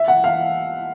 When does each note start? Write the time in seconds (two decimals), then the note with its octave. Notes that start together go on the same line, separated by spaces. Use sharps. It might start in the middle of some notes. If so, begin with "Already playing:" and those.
Already playing: E5
0.08 F#5
0.24 F5